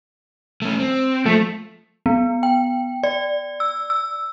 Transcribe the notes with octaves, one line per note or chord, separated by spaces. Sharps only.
A3 C#4
C4
F3 A3
B3
G5
D5
E6
E6